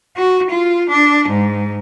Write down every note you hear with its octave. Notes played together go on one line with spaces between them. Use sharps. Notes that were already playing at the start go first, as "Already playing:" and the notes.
F#4
F4
D4
G#2